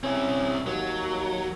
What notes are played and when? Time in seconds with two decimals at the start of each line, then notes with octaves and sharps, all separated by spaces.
0.03 C4 C#4 E4
0.67 D#2 F#3